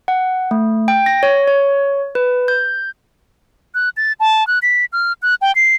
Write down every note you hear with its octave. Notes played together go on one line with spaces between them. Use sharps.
F#5
A3
G5
A#6
C#5
C#5
B4
G6
F#6
A6
A5
F#6
B6
F6
F#6
G5
C7